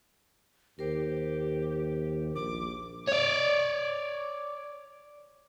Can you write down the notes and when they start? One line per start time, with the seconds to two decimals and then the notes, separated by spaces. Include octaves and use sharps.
0.79 D#2 G4 A#4 C5
2.35 A#1 D6
3.08 C#5 D5